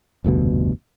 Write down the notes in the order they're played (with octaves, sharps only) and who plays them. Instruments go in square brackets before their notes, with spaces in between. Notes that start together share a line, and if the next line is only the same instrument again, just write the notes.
[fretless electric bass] F1 D2 G2 B2